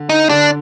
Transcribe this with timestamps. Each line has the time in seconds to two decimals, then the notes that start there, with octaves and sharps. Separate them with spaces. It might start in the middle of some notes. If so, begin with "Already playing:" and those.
Already playing: D3
0.09 D#4
0.29 D3 D4